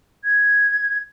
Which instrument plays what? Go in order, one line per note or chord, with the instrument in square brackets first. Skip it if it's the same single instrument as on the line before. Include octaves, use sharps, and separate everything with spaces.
[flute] G#6